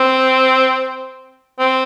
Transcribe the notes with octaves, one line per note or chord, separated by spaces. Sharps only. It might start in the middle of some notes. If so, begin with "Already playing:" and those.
Already playing: C4
C4